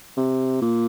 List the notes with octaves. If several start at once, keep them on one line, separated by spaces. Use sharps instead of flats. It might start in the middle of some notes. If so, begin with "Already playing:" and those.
C3
A#2